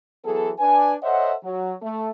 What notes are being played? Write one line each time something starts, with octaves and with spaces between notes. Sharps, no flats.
E3 F#3 B3 G#4 A4
D4 B4 G#5
A4 C5 C#5 D#5 E5 F#5
F#3
A3